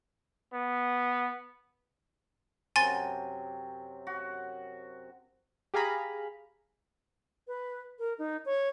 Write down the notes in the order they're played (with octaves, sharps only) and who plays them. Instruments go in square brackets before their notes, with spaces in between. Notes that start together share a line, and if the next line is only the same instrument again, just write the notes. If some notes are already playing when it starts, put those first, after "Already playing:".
[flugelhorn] B3
[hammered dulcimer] F#2 C3 [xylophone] G#5 C6 A6
[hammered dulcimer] F#4
[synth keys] G4 G#4 F5 G#5 A#5 B5
[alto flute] B4
A#4
D#4
C#5